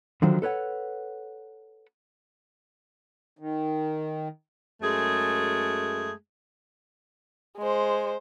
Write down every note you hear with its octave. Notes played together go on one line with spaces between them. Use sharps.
D3 D#3 F3 F#3
A4 B4 C#5 F#5
D#3
F#2 G#3 A3 G#4
G#3 C5